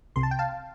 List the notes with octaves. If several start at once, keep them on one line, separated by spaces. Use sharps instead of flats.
C2 C3 C6
A5
G5
F5 A5